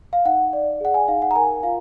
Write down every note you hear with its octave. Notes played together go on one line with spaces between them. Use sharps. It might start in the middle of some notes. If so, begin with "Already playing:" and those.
F5
D#4 F#5
D5
G#4 F#5
G#5
D#4 F5
F#5
A#5
A#4 G#5
F4 F5